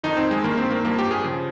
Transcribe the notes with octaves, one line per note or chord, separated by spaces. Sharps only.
F2 D#3 D#4
C4
G#3
G2 D#3 A#3
C4
A#3
G2 F3 A#3
G4
G#4
C#3 F3